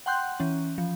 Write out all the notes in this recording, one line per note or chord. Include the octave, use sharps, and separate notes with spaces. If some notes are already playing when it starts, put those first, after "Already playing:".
F#5 G5 C6 F#6 G6
E3 C#4
F3